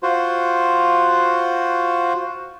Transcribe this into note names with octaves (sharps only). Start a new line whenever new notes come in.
F4 F#4 C5